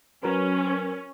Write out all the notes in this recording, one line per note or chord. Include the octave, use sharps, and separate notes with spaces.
F#3 C#4 A#4 B4